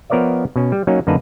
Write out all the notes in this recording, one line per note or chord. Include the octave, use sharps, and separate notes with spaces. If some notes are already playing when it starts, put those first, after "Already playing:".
F3 B3 A#4 C#5 D5 E5
B2 C#4
G3
F#3 A#3 C#4 D#4
F#2 D3 A#3 D#4 B4 A5